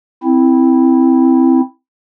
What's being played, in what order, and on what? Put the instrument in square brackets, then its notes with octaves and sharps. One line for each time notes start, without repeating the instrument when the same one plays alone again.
[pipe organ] C4 E4